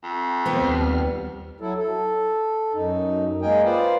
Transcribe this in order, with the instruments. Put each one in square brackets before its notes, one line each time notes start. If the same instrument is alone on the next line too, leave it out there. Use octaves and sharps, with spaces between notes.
[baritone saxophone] F2
[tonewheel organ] D#3 F3 C5 [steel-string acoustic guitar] B3 C4
[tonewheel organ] D#2 G3 F6
[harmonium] F#3 E4 A4
A4
F#2 D#4
G#3 A#3 A#4 D#5 G5 G#5
F4 B4 C5 D5 F5